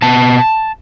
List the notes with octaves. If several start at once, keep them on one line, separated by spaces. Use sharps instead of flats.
B2 B3 A5